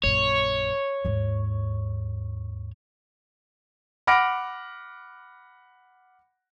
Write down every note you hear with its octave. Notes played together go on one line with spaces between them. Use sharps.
A#1 F#2 C#5
D#2 G#2
F#5 B5 D6 F6 A#6 D7